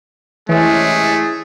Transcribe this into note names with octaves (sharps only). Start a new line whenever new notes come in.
C3 E3 G#3 A3 C#4 G#4